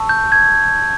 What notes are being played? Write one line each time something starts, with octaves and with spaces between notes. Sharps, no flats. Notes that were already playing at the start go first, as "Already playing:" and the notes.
Already playing: A5 C#6 E6
G6
G#6